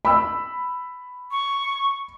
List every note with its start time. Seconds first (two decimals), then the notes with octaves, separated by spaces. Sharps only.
0.05 B5 E6
1.31 C#6